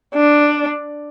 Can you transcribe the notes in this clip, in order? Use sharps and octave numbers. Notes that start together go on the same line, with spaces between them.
D4